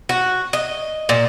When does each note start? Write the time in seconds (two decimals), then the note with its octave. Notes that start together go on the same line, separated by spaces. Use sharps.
0.09 F#4
0.53 D#5
1.09 A#2